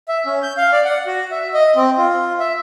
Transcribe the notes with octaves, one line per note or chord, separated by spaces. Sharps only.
E5
C#4
G6
F5
D5
F#5
F#4
E5
D#5
C4
F4
E5